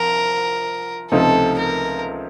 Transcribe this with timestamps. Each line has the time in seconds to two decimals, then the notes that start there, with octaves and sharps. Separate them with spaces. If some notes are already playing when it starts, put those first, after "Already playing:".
Already playing: C2 F3 A#4
1.12 C#2 C3 F3 A3 D#4 A4
1.59 A#4